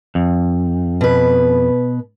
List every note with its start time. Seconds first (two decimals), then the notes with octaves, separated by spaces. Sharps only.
0.15 F2
1.01 B2 B4